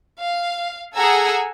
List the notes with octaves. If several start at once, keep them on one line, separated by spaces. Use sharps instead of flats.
F5
G#4 A4 F#5 G#5 A#5 E6